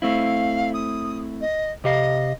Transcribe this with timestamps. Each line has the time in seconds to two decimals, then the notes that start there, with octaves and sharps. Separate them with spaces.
0.02 A3 C4 E4 F5
0.73 D#6
1.41 D#5
1.84 C3 G4 D#5 F5